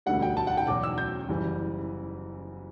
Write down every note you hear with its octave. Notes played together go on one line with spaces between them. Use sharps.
E1 D2 D3 G3 F#5
G5
A5
F#5
G5
E2 B2 F#3 D6
E6
G6
F#1 E3 G3